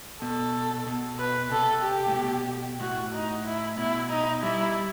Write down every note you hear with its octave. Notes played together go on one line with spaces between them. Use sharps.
B2 A4
B2
B4
C3 A4
G4
A2
B2
A2 F#4
D#4
E4
B2 E4
D#4
G3 E4